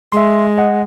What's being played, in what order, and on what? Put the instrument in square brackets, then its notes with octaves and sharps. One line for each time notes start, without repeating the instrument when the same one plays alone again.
[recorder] G#3 [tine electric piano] E5 C6
[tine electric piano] D#5 F#5